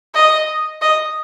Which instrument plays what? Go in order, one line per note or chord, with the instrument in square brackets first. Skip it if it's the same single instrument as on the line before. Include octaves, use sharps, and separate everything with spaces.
[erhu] D#5
D#5